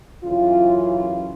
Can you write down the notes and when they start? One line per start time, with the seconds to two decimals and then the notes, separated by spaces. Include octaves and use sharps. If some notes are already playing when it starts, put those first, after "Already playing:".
0.24 F#2 C#3 E3 F4
0.74 F4